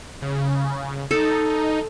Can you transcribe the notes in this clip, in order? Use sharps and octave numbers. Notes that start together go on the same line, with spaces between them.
C#3
D#4 A4